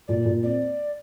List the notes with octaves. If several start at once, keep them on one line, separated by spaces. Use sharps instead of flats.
A#2 D5
A#2
C4 D5